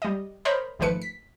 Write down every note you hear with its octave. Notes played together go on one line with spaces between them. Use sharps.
G3 D#5
A#4 C5 C#5 D#5 B5 G6
G#1 D#3 F3 A3 B4 C#7
B6